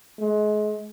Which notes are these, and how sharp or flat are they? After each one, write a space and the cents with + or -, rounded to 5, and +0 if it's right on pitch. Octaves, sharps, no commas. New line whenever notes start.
G#3 +30